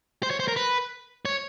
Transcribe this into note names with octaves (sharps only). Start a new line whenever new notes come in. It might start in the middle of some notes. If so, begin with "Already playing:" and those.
C5
C#5
C5
A#4
B4
C#5